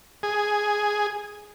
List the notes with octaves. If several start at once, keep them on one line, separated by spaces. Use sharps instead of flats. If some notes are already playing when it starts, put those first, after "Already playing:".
G#4